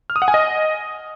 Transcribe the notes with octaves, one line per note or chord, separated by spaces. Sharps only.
F6
D#6
F#5
G#5
D#5